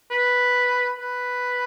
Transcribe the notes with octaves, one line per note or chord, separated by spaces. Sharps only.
B4
B4